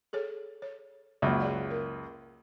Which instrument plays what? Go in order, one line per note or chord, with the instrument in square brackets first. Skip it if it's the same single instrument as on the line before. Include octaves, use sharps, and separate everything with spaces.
[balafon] G#4 A4 C#5
C#5
[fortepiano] C#2 F#2 [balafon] A#3
[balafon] G#4 D5 F#5
A#4